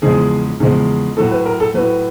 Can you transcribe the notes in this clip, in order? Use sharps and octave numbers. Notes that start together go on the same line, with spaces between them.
E2 C#3 F3 G#3 G#4
E2 C#3 F3 G#3
A2 F#3 A4
B4
A#4
A4
A2 F#3 B4